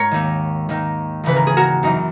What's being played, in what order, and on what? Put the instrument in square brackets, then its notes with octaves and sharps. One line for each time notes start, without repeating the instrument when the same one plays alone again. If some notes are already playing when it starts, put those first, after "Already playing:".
Already playing: [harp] G#2 A#4 C#5
D#2 D#3
D#2 D#3
D#2 C#3 E3 B4
A#4
G#4
F#4 A#4
F#2 E3 D#4